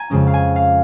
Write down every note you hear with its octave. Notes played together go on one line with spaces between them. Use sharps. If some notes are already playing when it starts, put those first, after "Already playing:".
Already playing: G#5 A#5
F2 C#3 G#3 C#4
F5
G#5
F5